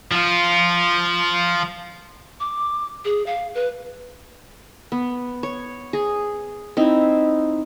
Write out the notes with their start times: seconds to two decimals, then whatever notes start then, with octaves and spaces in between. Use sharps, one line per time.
0.11 F3 F4
2.40 D6
3.05 G#4
3.26 F5
3.55 B4
4.92 B3
5.43 C#5
5.93 G#4
6.77 C4 D#4 E4